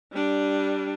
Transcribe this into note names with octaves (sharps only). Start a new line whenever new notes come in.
G3 D4